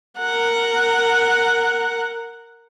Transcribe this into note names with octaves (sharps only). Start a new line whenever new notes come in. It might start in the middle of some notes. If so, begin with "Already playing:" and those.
A#4 F#5